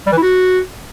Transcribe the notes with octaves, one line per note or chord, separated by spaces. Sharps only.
G3
E3
E4
F#4